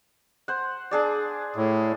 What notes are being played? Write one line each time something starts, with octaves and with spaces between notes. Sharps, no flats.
C5 F#5
D4 G#4 D5
A2